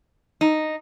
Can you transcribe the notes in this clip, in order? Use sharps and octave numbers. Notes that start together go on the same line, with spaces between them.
D#4